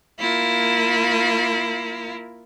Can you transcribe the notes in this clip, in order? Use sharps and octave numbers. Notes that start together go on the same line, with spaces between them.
A#3 E4 F4